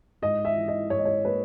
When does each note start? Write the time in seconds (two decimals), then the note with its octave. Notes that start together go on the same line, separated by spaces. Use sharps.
0.22 G#2 D#5
0.45 E5
0.56 E3
0.68 D#5
0.90 G#2 C#5
0.99 D#5
1.05 C#5
1.25 A#3 B4